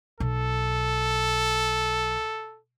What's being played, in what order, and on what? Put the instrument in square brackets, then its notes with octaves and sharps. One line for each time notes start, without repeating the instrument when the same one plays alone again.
[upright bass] B1 [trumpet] A4